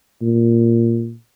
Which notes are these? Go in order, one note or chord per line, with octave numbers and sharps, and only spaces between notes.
A#2